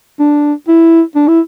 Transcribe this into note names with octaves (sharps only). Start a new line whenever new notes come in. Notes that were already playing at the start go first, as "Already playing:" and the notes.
D4
E4
D4
E4